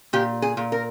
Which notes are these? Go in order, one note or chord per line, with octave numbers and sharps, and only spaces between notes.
A#2 G4
G#4
A#2
A#4